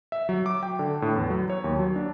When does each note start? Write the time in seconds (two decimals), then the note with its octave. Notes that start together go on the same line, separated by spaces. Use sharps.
0.12 E5
0.29 F#3
0.46 D6
0.63 G5
0.79 D3
1.02 A2
1.16 E2
1.30 F#3
1.50 C#5
1.64 D#2
1.79 F#3
1.96 D4